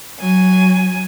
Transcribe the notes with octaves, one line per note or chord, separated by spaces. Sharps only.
F#3 G#5